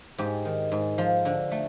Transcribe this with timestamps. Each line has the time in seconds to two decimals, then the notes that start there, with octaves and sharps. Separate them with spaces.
0.18 G#2 G4
0.45 D#3
0.72 G#2
0.98 F3
1.25 D3
1.51 A3